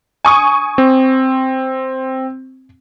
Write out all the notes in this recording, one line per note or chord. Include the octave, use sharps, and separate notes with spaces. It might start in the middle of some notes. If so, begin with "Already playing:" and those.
G#5 C#6 D#6
C4